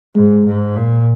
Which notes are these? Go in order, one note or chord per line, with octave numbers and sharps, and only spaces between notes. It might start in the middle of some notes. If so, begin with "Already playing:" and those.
G#2 G#3
G#2
A#2